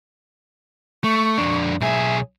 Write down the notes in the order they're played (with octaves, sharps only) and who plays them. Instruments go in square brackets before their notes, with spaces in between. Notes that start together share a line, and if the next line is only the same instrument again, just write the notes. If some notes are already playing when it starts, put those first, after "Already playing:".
[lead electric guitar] A3 [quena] C#6
[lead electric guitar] F2 D4
[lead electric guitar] B1 G#4 [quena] E5